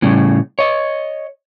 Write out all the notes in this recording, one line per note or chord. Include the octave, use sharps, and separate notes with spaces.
A2 C#3 G3
C#5 D#5